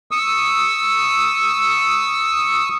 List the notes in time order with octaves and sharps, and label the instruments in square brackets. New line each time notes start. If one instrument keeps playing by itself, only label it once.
[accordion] C#6 D#6 E6